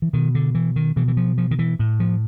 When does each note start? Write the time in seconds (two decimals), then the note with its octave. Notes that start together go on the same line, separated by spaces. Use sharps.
0.02 E3
0.13 B2 D#3
0.35 D3
0.55 E3
0.76 D#3
0.96 B2 E3
1.08 E3
1.17 F3
1.38 F3
1.51 D#3
1.59 E3
1.79 A2
2.00 F3